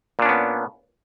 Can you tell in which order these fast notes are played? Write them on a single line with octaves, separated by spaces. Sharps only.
A#2 D4 C#4 B3